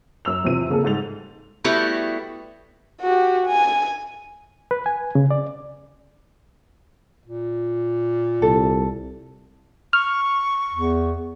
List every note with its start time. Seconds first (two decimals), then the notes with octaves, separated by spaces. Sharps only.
0.25 F#2 E6 F7
0.44 E2 C3 F3 D#7
0.70 C#3 A#3 G#4 A4
0.84 G#2 G3 A6 F7
1.64 G3 A3 B3 E4 F#4 G4
3.01 F#4 G4
3.47 G#5
4.71 B4
4.86 G#5
5.15 C#3
5.31 D5
7.25 A#2
8.42 C2 A4
9.93 C#6 F6
10.74 E2